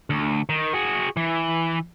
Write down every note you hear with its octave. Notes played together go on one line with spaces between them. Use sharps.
D2
D#3
F#4 G#4
E3